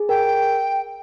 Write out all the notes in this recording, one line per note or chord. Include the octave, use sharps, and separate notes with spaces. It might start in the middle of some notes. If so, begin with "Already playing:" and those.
Already playing: G#4
A#4 G5